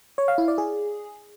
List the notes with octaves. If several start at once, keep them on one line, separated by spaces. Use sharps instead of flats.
C#5
F5
E4
D5
G#4